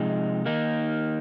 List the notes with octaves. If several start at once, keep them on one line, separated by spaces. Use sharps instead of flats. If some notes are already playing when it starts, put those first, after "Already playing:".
Already playing: C3 F3 G#3 D#4
D#3 A#3 D#4